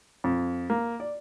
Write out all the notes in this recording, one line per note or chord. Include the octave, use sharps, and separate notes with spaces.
F2
A#3
D5